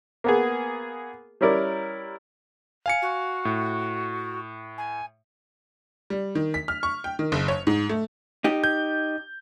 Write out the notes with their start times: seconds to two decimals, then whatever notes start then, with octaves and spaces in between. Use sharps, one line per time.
0.24 A#3 B3 G#4
1.41 G3 C#4 E4 A#4 D5
2.86 F5 G#5 C#7
3.02 F#4
3.45 A2
4.78 G#5
6.10 G3
6.35 D#3
6.54 B6
6.68 F6
6.83 C#6
7.04 G5
7.19 D#3
7.32 F#1
7.48 C#5
7.67 G#2
7.89 A3
8.44 D#4 G4
8.64 G6